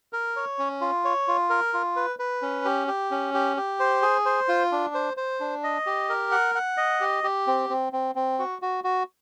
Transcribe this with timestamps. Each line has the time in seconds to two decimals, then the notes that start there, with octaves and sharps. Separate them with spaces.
0.13 A#4
0.36 C#5
0.59 C#4
0.81 F4
1.04 C#5
1.28 F4
1.50 A#4
1.73 F4
1.96 B4
2.19 B4
2.42 C#4
2.65 G4
2.88 G4
3.11 C#4
3.34 G4
3.57 G4
3.80 C5
4.02 G#4
4.26 C5
4.48 F4
4.72 D4
4.94 C5
5.17 C5
5.40 D4
5.64 D#5
5.86 G4
6.09 A#4
6.32 F#5
6.55 F#5
6.77 D#5
7.01 G4
7.24 G4
7.47 C4
7.70 C4
7.93 C4
8.15 C4
8.39 F#4
8.62 F#4
8.84 F#4